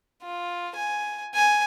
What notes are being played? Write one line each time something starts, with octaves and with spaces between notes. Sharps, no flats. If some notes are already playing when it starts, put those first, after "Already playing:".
F4
G#5
G#5